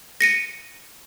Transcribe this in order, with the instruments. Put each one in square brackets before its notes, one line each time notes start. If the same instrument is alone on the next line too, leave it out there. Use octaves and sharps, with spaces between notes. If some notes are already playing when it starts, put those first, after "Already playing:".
[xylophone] A#6 C#7 D#7